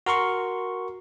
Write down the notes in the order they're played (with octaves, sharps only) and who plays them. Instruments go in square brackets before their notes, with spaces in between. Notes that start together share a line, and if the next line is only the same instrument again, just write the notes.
[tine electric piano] F#4 A#4 C6 C#6